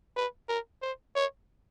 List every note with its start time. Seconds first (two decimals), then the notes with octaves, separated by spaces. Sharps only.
0.16 B4
0.49 A#4
0.82 C5
1.15 C#5